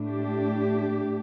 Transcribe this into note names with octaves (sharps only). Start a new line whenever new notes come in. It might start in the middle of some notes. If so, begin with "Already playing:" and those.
Already playing: A2 A3 D4
G4